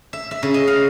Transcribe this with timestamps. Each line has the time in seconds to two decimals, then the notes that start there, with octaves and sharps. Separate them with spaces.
0.13 E5
0.31 E5
0.43 C#3
0.54 D#5
0.67 F5